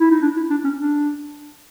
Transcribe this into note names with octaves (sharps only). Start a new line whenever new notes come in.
E4
D#4
D4
E4
D4
C#4
D4